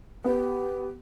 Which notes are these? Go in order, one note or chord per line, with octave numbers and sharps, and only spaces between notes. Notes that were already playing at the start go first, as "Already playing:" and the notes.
B3 G4